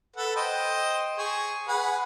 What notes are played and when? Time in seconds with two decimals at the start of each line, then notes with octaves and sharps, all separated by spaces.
0.16 A4 B4 F#5
0.36 C5 D#5 G5
1.18 G#4 C#6
1.68 G#4 B4 F#5